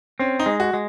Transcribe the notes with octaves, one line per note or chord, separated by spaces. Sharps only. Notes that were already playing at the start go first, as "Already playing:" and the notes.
C4 C#4
D#4
G#3
F#4
G#3